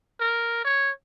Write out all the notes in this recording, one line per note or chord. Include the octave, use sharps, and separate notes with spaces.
A#4
C#5